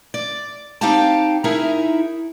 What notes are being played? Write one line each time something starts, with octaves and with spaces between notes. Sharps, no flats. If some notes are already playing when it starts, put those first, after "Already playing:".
D5
C4 D#4 G4 F5 G5 A5
D#4 E4 G#4 A#4 E5